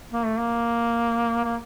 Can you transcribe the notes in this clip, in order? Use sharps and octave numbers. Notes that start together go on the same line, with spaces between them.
A#3
A3
A#3
A#3